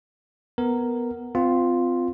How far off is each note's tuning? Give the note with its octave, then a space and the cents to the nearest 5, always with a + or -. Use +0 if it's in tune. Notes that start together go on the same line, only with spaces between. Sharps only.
B3 +0 A#4 -5
C4 -30 F4 +0